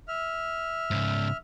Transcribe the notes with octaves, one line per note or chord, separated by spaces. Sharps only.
E5 F6
G#2 C#3